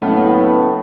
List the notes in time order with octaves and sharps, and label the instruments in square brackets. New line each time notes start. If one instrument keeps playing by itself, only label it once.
[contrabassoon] F#1 [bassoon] A2 [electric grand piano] A3 D#5 F6 [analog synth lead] B3